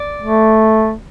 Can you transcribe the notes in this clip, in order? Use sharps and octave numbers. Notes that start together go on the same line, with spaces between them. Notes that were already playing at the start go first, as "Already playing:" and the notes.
Already playing: D5
A3